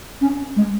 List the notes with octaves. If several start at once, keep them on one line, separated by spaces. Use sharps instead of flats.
C#4
G#3